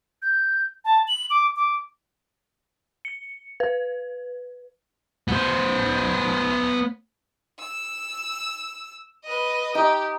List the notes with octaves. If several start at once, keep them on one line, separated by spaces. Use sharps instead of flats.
G6
A5
F#7
D6
D6
C#7
B4
B3 C5
E6
B4 D#5
D#4 G4